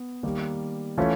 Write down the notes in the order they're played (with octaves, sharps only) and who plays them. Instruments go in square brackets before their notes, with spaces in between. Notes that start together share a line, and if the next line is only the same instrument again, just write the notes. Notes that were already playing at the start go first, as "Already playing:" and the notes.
Already playing: [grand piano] B3
D#3 G3 A#3
E3 A3 C#4 F4